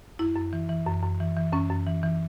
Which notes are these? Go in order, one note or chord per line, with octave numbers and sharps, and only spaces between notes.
F#2 E4
F#2
E3
E3
F#2
F#2
E3
E3
F#2 C#4
F#2
E3
E3